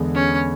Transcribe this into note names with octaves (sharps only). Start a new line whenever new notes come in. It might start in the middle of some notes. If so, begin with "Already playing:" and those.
Already playing: E2 D3 G#3 B3
C#4